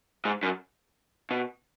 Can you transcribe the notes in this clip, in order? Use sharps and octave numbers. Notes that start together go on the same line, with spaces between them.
G#2
F#2
B2